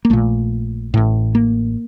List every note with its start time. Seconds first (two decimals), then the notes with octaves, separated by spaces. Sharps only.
0.05 A#3
0.10 A#1 A#2 A3
0.94 A1 A2
1.35 A#3